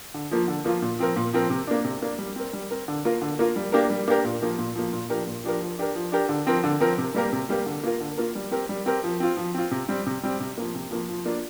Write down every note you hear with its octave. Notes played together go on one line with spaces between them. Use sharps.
D3
F3 A#3 F4
D3
F3 A#3 F4
A#2
F3 C4 A#4
A#2
F3 C4 A#4
C3
A#3 D4
C3
A#3 D4
G3
C4 A#4
G3
C4 A#4
D3
A#3 F4 A#4
D3
A#3 F4 A#4
G3
A#3 D4 G4 A#4
G3
A#3 D4 G4 A#4
A#2
F3 A#3
A#2
F3 A#3
A#2
F3 D4 G4 A#4
A#2
F3 D4 G4 A#4
F3
D4 G4 A#4
F3
D4 G4 A#4
D3
F3 C4 A#4
D3
F3 C4 A#4
C3
G3 A#3 G4 A#4
C3
G3 A#3 G4 A#4
D3
A#3 F4 A#4
D3
A#3 F4 A#4
G3
C4 G4 A#4
G3
C4 G4 A#4
F3
C4 F4
F3
C4 F4
C3
G3 C4
C3
G3 C4
C3
F3 A#3
C3
F3 A#3
F3
A#3 D4 F4